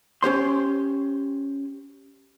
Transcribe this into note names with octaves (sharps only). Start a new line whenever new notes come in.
C#4 G4 C5 C6